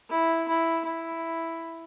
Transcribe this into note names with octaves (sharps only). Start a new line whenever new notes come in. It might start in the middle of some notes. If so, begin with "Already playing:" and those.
E4
E4
E4